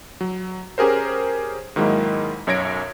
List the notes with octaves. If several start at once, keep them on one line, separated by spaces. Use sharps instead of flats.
F#3
C#4 G4 G#4 A#4 C5
G#2 D#3 F#3 G#3 A#3 E4
B1 F#2 C#5 G#6 A#6 D7